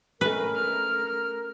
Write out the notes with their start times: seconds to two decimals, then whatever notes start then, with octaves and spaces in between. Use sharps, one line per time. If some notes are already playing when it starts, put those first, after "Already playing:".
0.21 A3 C#4 A#4 B4
0.56 F6